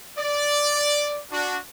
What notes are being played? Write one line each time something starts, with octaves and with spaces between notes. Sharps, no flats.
D5
D4 F#4